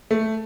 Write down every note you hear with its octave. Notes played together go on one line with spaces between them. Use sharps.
A3